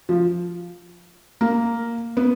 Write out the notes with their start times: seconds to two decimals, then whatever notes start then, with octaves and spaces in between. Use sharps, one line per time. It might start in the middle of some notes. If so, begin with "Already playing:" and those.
0.09 F3
1.41 A#3
2.17 B3